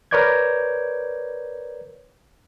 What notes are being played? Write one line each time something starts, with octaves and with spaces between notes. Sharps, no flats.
A#4 B4 C#5 D5 G6 G#6